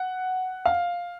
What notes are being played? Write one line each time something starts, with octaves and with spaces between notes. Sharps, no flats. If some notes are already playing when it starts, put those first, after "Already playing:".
Already playing: F#5
F5